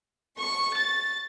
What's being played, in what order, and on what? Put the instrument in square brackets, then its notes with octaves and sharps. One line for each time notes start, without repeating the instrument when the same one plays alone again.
[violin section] C#6
A6